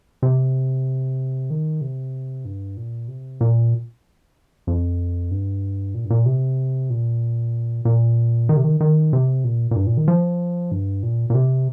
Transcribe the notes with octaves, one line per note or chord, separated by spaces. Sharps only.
C3
D#3
C3
G2
A#2
C3
A#2
F2
G2
A#2
G2
A#2
C3
A#2
A#2
D#3
C3
D#3
D#3
C3
A#2
A#2
G2
A#2
D#3
F3
G2
A#2
A#2
C3